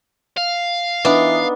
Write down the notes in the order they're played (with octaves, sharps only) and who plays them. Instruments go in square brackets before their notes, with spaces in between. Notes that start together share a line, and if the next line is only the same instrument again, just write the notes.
[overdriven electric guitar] F5
[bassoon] E3 [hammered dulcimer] B3 D#4 [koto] D4